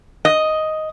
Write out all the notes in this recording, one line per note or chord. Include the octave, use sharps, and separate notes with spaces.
D#5